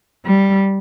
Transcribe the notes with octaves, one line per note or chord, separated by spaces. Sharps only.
G3